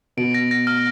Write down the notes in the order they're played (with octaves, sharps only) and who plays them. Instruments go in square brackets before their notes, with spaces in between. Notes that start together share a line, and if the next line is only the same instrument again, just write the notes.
[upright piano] B2 [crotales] D7
[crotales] A#6
A#6
F6